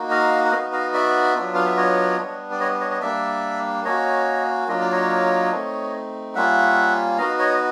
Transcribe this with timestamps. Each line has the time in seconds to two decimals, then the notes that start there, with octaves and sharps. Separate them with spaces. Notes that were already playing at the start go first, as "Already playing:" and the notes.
Already playing: A#3 D#4 F#4
0.10 D#5 F5
0.45 F#5
0.51 B3 D#4 F#4 D#5 F5
0.72 D#5 F5
0.94 D5 E5
1.36 F#3 B3 D4 F4
1.55 F5
1.66 E5
1.77 C#5 D#5
2.18 G3 B3 D4
2.51 D5
2.60 C#5 D#5
2.80 C#5 D#5
2.91 C#5 D#5
3.01 G3 A#3 D4 D5 E5
3.85 A#3 C#4 F#4 C#5 D#5
4.68 F#3 A#3 D4 F4 D#5
4.80 D5
4.92 C#5 D#5
5.52 A3 C4 D#4
6.35 G3 A#3 C#4 F4 E5 F#5
7.18 B3 D#4 F#4 D#5 F5
7.39 C#5 D#5
7.54 D#5